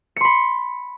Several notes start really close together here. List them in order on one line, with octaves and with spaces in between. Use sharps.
C#7 C6 B5